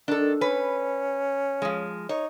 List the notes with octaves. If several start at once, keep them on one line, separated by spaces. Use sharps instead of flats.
D#3 D4 A4
C#4 B4
F3 G#3
D#4 C#5